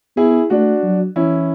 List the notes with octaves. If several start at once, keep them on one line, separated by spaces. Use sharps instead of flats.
B3 E4 G#4
A3 D4 F#4
F#3
E3 C#4 E4